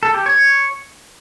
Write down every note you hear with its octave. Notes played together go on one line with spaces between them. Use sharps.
A4
G4
C#5